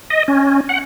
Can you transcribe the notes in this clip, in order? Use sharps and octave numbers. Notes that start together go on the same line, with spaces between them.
D#5
C#4
F#5